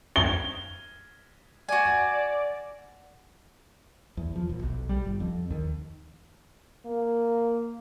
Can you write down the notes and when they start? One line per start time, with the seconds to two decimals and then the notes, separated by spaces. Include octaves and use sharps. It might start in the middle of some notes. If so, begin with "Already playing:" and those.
0.16 G7
1.69 F#4 D5 G#5
4.17 E2
4.36 F3
4.49 D#1
4.63 B1
4.89 G3
5.05 G1
5.20 F2
5.50 D#2
6.86 A#3